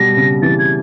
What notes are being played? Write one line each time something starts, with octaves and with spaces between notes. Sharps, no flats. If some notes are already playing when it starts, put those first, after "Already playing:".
Already playing: B2 G3 A#6
C#3
E3 A6
G#6